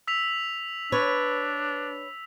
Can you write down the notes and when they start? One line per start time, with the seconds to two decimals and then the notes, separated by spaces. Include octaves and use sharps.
0.07 E6 B6 F7
0.92 D4 B4 C#5